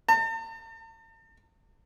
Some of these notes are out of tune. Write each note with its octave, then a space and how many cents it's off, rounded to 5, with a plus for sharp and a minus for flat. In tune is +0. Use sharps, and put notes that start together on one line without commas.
A5 +45